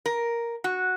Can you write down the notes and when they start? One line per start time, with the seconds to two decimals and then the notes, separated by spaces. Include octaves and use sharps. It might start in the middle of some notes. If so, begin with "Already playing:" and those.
0.06 A#4
0.64 F#4